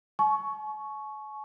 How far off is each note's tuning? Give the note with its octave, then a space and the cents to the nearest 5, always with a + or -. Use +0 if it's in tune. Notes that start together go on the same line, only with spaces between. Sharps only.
G#5 +45 C#6 +0